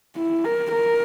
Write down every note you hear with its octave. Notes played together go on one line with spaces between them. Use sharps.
E4
A#4
A#4